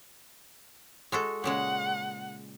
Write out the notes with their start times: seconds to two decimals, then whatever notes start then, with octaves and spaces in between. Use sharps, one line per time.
1.12 G#3 F#4 A4
1.44 A#2 C#3 G#3 F#5